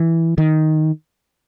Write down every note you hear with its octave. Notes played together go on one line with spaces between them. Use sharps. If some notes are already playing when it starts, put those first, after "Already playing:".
Already playing: E3
D#3